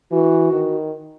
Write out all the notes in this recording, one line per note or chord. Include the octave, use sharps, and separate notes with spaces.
E3 F#4
D#3